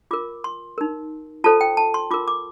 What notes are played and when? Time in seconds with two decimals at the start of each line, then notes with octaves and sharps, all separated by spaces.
0.11 F4 A#4 D6
0.44 C6
0.78 D#4 A#4
1.44 F4 A4 C5 A5
1.61 G5
1.77 A5
1.94 C6
2.11 F4 A#4 D6
2.28 D6